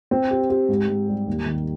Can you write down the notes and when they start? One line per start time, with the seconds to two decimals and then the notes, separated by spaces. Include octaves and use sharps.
0.11 C4
0.31 G4
0.50 G4
0.68 G#2
0.88 G#2
1.08 G3
1.27 D#2
1.46 D#3